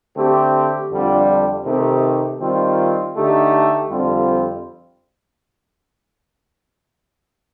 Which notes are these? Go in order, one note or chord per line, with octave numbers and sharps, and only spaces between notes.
D3 A3 C4 G4
F2 D3 G3 D4 F4
C3 D#3 A3 D#4 G4
D#3 G3 C4 F4
D3 A3 D#4 G4
F2 D3 G3 C4 F4